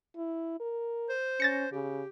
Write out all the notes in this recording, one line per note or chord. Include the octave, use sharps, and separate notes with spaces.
E4
A#4
C5
C#4 A6 A#6 C#7
C#3 G4